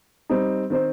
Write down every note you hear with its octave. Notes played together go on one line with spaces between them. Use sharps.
G3 C4 D#4
D#3 C4 D#4 C5